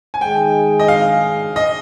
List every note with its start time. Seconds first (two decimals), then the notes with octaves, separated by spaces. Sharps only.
0.14 G#5
0.21 D#3 G#3 D#4 G#4 G5
0.79 D#5
0.88 F5
1.56 D#5